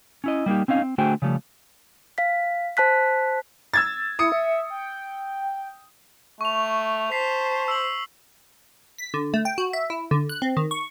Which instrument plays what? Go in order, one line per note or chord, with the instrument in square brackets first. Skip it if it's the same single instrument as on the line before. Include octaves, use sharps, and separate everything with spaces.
[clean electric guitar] C#4 E4 D#5
G3 A#3 D#4 G4
C4 C#4 D#4 F5
C4
D3 A3 F#4 G#4 C5 G5
C#3 F3 G3 A3
[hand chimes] F5 B6
C5 A5 F#6 B6
[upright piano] E6 G#6 A6
[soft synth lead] E4 [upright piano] D#6 C#7
[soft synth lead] E5
G5
[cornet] A3 [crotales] C#6 F7
[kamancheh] C5 [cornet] A5 [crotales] B6 C7
[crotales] E6 F#7
[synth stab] B6
D3
A3
G5
F#4
E5
E4
D3
F#6
C4
D#3
C#6